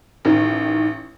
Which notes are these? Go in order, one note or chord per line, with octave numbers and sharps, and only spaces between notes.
A1 D#3